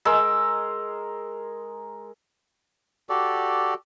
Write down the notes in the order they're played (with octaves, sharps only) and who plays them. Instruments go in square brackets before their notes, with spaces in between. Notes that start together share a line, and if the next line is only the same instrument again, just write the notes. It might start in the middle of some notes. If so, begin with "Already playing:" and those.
[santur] G#3 A#4 E6
[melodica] F#4 G4 A4 D5